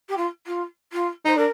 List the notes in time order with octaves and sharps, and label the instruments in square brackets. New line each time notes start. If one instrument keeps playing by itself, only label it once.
[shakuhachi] G4
F4
F4
F4
[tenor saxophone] D#4 [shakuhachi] C5
[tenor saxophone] D4 [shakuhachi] A#4